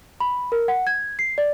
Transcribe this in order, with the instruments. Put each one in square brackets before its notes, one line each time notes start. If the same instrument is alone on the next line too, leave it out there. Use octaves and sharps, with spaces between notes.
[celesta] B5
A#4
F#5
G#6
C7
D5